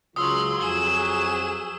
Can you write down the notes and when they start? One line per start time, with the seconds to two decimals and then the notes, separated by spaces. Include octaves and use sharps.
0.16 C#2 C#3 F#3 F4 C6 D#6 E6 F#7
0.61 F2 G#4 E7 G7